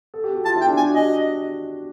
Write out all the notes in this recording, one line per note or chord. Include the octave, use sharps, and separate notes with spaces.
A4
G4
F#4
F4 A5
E4 G5
D4
D4 G#5
F#4
D#5
G4